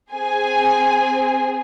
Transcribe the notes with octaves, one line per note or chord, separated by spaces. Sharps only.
C4 G#4 G#5